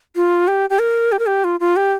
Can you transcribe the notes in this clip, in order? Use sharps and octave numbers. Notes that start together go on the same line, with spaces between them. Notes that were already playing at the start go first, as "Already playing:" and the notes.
F4
G4
G4
A#4
G4
A#4
G4
F4
F4
G4